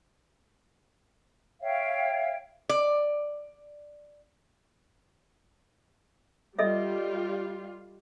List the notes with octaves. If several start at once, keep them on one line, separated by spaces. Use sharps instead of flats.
C#5 E5 F5 G5
D5
G3 F4 A4 D#5 E5